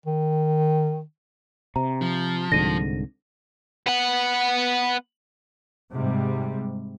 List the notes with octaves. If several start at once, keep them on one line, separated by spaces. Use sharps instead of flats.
D#3
C3 A#5
F3
C2 G#2 D3 A#6 D#7
B3 F#5
G#2 C3 G3